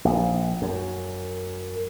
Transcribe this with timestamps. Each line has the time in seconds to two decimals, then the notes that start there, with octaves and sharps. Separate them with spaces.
0.05 A#1
0.62 F#2